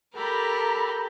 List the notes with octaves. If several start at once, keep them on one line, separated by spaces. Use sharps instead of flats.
G4 A4 A#4 A#5 B5